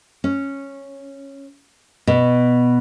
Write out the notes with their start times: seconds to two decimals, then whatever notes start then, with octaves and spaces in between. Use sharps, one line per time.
0.24 C#4
2.07 B2